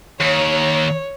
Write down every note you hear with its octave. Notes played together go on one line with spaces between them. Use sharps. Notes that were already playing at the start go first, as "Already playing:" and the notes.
D#2 C#5